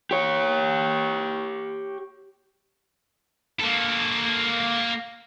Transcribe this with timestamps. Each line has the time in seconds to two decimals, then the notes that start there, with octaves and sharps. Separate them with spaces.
0.11 G4 C#5
3.60 A#3 A4